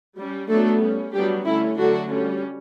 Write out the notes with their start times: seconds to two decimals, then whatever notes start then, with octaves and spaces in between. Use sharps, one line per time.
0.17 G3 C#4
0.49 F#3 A3 B3 D4 A4
0.81 G3 C#4
1.14 F#3 G3 B3 D4 G4
1.45 D3 A3 C#4 E4
1.77 D3 F#3 A3 D4 F#4
2.10 G3 C#4